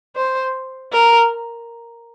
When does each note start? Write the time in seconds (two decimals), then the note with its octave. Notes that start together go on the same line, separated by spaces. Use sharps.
0.16 C5
0.93 A#4